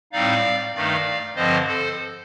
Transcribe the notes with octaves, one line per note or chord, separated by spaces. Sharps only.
A2 G3 C4 D#4 D5 F5
G2 D#3 A3 D#4 D5 F5
G2 D3 F3 C4 C5 D#5
A4 C5